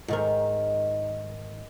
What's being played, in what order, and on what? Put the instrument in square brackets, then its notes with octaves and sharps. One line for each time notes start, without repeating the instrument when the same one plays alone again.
[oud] G#2 D#3 A#4